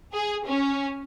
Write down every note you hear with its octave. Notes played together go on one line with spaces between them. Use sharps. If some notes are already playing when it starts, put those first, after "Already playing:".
G#4
C#4